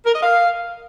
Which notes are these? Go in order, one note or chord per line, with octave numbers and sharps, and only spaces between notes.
A#4
D#5
F5